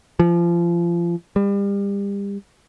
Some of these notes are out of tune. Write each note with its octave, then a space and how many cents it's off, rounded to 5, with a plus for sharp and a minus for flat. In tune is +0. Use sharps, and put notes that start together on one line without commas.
F3 -30
G3 +35